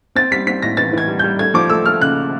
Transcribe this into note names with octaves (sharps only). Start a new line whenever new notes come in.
C4 A6
G3 B6
C4 B6
A2 A#6
E3 A6
E3 G#6
G3
G3 G6
A3 G#6
F3 D6
A3 E6
A3 F6
C#3 F#6